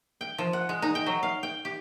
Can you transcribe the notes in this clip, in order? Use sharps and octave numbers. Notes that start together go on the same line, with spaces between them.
G5
F3
F#5
G#3
D#4
G5
F#3
F5
G5
G4